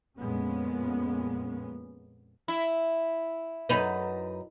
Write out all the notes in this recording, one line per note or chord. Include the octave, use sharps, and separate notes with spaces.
F2 A#2 G#3 A#3 B3 C#4
E4
F#2 D#4 B4